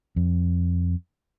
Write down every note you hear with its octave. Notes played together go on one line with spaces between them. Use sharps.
F2